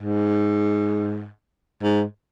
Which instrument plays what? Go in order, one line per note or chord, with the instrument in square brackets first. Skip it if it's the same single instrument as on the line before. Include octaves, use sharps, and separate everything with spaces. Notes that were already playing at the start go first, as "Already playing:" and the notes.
[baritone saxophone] G#2
G#2